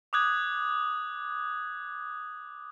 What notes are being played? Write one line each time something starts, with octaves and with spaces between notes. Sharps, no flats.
D6 D#6 F#6 G#6